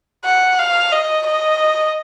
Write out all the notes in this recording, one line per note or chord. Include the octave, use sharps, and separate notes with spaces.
F#5
F5
D#5
D#5